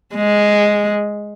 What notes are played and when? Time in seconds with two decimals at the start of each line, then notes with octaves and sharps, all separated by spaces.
0.15 G#3